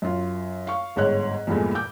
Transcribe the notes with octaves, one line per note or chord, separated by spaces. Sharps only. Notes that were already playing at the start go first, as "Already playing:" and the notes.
F#2 F4
F5 C#6
G1 G#2 C#5 F#6
E2 G2 A#2 E3 G#3 A3
D6 G6